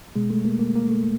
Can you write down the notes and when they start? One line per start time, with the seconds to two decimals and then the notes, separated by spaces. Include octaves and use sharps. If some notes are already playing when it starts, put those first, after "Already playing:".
0.16 B2 G#3
0.30 A3
0.45 A#3
0.59 A#3
0.75 A#3
0.89 A3